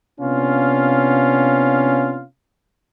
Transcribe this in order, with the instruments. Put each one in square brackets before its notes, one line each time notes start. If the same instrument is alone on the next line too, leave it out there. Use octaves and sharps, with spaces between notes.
[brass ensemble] C3 B3 C#4 D4 F4 F5